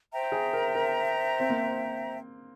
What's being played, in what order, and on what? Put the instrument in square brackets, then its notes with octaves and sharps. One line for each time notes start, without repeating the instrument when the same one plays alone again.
[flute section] C5 E5 G5 A#5
[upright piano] G#4
A#4
A#4
C4
A#3